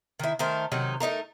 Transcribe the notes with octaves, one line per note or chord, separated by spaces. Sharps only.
D#3 E4
D#3 A3 A#4 C5
C3 D#3 F#3 D#4
A3 D#4 F4 A#4